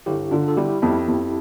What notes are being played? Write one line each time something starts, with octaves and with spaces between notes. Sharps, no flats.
G1 E4 G4
D3 D4 F4
A4
G3 E4 G4
F2 E4 G4
F2